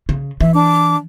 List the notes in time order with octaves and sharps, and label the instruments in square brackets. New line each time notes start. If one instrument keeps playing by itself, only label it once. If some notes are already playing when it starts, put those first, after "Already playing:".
[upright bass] C#3
[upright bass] E3 [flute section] E5
[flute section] D4 D6